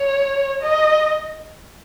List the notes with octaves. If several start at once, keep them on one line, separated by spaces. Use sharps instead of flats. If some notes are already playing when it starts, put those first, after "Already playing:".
Already playing: C#5
D#5